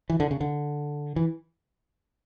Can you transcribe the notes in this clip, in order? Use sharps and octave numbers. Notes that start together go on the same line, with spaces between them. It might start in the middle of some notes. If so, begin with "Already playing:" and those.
E3
D3
C#3
D3
E3